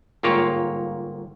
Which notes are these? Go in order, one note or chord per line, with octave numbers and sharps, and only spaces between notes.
G1 G#2 A#3 F4 G4 C#5